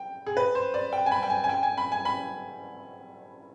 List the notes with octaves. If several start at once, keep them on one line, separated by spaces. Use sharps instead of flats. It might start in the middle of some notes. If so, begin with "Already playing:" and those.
Already playing: G5
G#4
B4
C5
D5
G5
G#5
B5
G5
G#5
G#5
G5
G#5
B5
G#5
B5